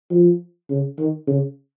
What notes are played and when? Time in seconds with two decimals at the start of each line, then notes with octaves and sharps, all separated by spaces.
0.11 F3
0.69 C#3
0.98 D#3
1.27 C#3